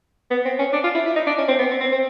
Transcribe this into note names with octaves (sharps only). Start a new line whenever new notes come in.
B3
C4
C#4
D4
F4
E4
E4
D#4
D4
C#4
C4
B3
C4
C4
C4